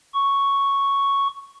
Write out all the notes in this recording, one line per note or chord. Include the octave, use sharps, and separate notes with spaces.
C#6